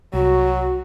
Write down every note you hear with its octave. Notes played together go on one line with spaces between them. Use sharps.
C2 F#3 F#4